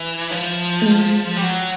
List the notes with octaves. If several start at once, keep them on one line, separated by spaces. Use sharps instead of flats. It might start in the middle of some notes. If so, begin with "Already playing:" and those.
Already playing: E3
F3
A3
G#3
G3
F#3